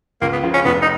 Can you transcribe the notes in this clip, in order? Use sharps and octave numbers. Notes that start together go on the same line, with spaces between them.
C#2 A#3
B3
C#3 F3
C#4
F1 B3
D#4